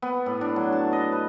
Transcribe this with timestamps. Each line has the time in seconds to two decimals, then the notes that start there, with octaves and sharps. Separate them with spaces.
0.02 B3
0.26 A2
0.41 D4
0.56 F#3
0.72 A5
0.93 D#5
1.12 B4